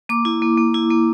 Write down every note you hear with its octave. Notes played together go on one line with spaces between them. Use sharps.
A#3 D6
E4
A#3
A#3
E4
A#3